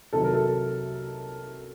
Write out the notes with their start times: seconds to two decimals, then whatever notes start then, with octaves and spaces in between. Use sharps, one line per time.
0.13 C2 C3 D#3 F#3 A4
0.23 A#4
0.34 A4